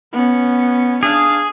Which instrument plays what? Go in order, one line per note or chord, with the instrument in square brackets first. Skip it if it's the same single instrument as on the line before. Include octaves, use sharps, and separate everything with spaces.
[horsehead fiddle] B3 C#4
[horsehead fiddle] D4 F5 [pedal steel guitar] G#4